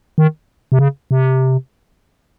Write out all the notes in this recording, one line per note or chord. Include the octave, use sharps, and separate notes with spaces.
D#3
C3
C#3
C3